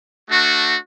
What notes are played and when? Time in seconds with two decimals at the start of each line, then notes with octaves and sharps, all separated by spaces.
0.27 A3 D4 F#4